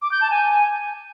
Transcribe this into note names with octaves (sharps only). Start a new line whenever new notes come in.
D6
G6
A5
G#5